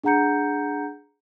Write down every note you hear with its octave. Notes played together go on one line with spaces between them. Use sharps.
D4 G#4 F#5 A#5 G6 C#7